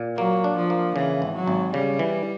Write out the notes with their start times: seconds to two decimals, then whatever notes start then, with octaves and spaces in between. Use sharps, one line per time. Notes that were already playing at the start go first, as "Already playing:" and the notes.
Already playing: A#2
0.17 F#3 A#3
0.44 D4
0.57 F3
0.70 A#3
0.96 C#3 E3
1.22 G#1
1.35 F#3
1.47 G#1
1.73 C#3 G3
1.99 E3